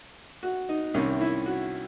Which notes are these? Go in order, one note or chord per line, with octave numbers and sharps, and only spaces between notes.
F#4
D#4
C2 C3 D#3 C#4
E4
F#4